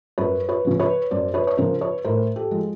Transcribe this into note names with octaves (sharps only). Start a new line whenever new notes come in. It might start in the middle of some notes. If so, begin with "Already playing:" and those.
F#2 B4 C#5
B4 C#5
C#3 F3
B4 C#5
F#2 C5 D5
B4 C#5
C#5
C#3 F3 A#4 C5
B4 C#5
A2 A#4 C5
G4 A4
F3 G#3